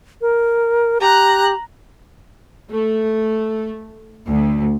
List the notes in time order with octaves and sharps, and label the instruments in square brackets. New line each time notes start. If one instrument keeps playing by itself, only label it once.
[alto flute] A#4
[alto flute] G4 [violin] A#5 F#6
[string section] A3
D2